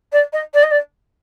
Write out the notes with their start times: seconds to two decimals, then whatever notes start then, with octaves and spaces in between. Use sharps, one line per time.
0.12 D5
0.33 D#5
0.54 D5
0.63 D#5
0.71 D5